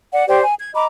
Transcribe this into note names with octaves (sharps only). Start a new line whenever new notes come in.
D5 F#5
G4 C5 D5 G5
G#5
G#6
D#5 A#5 B5 D6